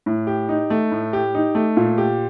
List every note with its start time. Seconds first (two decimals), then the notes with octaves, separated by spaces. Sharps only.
0.06 A2
0.27 G4
0.49 D#4
0.70 A3
0.92 A2
1.13 G4
1.35 D#4
1.55 A3
1.77 A#2
1.98 G4